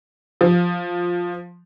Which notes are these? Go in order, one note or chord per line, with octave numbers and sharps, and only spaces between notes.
F3